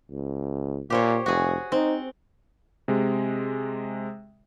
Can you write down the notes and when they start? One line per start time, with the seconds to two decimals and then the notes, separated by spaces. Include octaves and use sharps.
0.11 C#2
0.90 A#2 G4 C5 C#5
1.26 F1 F#4 G#4
1.72 C4 D#4
2.88 C3 G#3